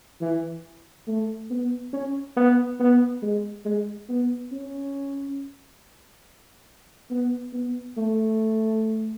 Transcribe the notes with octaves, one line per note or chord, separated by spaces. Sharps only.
E3
A3
B3
C#4
B3
B3
G#3
G#3
B3
C#4
B3
B3
A3